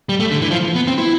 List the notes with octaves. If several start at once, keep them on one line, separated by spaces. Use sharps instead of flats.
G3
A3
D3
E3
F3
B3
C4
E4